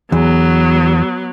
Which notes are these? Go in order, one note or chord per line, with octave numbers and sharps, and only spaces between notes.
E2 F#3 B3